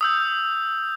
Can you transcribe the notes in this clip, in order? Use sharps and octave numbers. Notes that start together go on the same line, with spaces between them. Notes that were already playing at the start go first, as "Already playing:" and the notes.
D#6 E6 G6